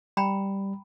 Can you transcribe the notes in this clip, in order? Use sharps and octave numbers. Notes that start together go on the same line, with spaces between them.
G3 G5 A#5 B5